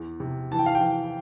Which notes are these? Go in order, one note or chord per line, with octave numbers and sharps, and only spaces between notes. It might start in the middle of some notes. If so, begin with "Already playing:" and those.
Already playing: E2 E3
C3
E3 A5
G5
F5
G5
E3